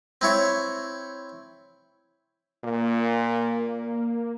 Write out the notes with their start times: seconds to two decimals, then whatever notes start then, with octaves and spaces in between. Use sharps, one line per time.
0.21 C4 E4 C#5
2.64 A#2 A#3